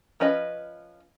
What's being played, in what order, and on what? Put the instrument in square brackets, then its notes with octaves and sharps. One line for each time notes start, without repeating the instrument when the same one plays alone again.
[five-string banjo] F3 C#4 B4 D#5